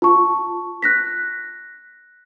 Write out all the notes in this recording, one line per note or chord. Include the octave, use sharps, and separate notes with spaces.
F4 A5 C#6
F#6 A#6 B6